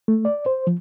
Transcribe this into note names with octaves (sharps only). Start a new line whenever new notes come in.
A3
D5
C5
F3